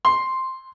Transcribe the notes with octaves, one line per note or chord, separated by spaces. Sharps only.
C6